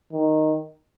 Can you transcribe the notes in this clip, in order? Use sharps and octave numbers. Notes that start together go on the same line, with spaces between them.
D#3